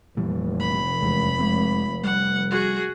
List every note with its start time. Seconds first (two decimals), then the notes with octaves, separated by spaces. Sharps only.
0.17 F1 A#2 E3 G3
0.60 B5
1.02 E2 E3 G#3
1.39 G#3 C4
2.04 G3 F#5
2.51 F#4 G#4